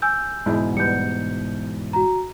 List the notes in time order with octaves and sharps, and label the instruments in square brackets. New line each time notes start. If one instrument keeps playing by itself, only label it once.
[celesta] G#5 E6 G6
[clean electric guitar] E2 G#2 B2 [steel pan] G#3 E4
[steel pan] G3 B3 [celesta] G6 C#7
[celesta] F#4 A#5